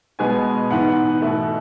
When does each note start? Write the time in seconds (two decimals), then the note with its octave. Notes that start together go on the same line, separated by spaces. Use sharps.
0.19 B2 G#3 B3 G#5
0.70 G#2 E3 B3 F#5
1.22 B2 A3